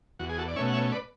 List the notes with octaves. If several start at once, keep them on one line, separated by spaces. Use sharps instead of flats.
E2 F#4
G#4
F#4 A4
D5
B2 A3 C#4 C#5 E5
F#5
C#5 E5
B4 D5